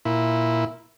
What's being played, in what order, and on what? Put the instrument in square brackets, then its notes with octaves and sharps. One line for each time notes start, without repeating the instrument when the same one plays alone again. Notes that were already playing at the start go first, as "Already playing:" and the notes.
[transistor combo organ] A#2 E4